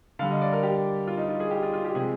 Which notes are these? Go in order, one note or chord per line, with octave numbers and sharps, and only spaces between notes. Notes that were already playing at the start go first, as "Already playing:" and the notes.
D3 G3 F5
D#5
D5
A#4
G4
F4
D#4
F4
G#4
G4
F4
F4
G4
C3 F3 G#3 G#4